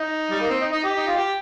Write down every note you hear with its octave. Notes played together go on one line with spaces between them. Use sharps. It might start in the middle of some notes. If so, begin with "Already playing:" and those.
Already playing: D#4
G3
A#3
C4
D#4
D#4
G4
D#4
F4
G4